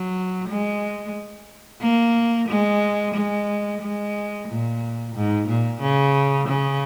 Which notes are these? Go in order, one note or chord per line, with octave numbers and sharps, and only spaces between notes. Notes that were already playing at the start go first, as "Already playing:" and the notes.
Already playing: F#3
G#3
A#3
G#3
G#3
G#3
A#2
G#2
A#2
C#3
C#3